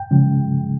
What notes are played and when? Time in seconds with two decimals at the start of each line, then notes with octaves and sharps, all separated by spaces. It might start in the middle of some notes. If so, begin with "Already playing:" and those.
Already playing: G5
0.11 C#3 F3 G#3